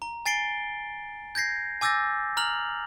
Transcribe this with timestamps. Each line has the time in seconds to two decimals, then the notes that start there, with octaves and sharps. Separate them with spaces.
0.02 A#5
0.26 G#5 A6 C7 D7 G7
1.35 G6 G#6 A#6 C7
1.81 G#5 D6 E6 G6 A6 A#6
2.37 A#5 F6 F7 F#7